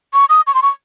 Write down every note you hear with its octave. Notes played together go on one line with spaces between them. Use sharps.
C#6
D#6
C#6
C6
C#6